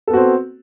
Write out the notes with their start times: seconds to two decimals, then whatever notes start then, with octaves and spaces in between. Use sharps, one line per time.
0.08 A4
0.11 B3
0.14 F#4
0.17 C4